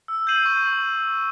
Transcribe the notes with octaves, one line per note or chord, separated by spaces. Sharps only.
E6
G6 C7 D#7 F#7
C#6